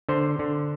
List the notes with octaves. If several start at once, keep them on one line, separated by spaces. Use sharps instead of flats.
D3 C5
D3